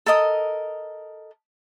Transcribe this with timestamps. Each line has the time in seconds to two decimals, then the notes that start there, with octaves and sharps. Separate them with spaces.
0.06 A4 A#4 D#5 D#6